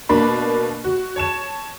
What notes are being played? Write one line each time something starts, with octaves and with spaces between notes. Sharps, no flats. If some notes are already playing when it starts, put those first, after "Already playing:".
B2 A#3 D4 B5
F#4
C#5 A5 E7